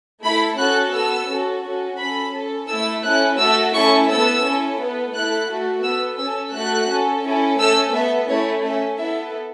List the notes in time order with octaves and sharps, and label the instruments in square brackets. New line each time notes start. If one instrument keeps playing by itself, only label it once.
[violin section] A3 E4 A4 B5
C#4 F#4 A4 F#6
B3 A4 E6
C#4 F#4 A4
C#4 F#4 A4
C#4 A4 B5
C#4 A4
A3 E4 A4 E6
C#4 E4 A4 F#6
A3 F#4 A4 E6
A3 C#4 E4 A4 C#6
B3 A4 E6
C#4 E4 A4
B3 A4
A3 E4 A4 F#6
A3 F#4 A4
B3 A4 E6
C#4 A4 E6
A3 F#4 A4 F#6
C#4 A4
C#4 E4 A4
A3 C#4 A4 E6
B3 A4 E5
A3 C#4 E4 C#5
C#4 A4 E5
B3 E4 A4 E5